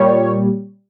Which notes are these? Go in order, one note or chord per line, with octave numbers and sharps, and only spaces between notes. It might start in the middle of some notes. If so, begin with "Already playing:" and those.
Already playing: A#2 G3 C#5